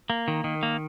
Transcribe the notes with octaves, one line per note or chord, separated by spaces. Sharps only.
A#3
D#3
D#3
A#3